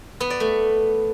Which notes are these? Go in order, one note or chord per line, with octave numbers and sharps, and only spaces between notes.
B3
D5
A3